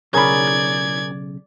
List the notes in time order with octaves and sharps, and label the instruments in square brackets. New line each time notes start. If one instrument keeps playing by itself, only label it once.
[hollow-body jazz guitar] B1 C#3 B5 [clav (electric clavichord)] G#4 A#4 C#5 [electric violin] D5 G#6